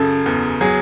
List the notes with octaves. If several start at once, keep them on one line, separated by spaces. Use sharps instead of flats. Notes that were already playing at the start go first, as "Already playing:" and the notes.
Already playing: F#2 C#3 A4
E2
F#3 G#4